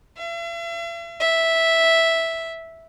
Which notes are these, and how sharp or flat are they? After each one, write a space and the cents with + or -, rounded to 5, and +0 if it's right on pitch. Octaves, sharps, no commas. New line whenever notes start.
E5 +45
E5 -5